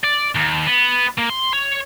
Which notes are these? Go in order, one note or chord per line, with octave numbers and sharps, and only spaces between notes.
D5
D#2
B3
A#3
C6
C#5